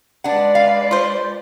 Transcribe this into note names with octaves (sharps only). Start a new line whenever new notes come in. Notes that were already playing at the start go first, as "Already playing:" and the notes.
G#3 D4 B4 D5 F#5
F5
F4 C5